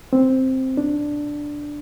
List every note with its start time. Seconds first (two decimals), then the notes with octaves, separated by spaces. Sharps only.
0.13 C4
0.77 D4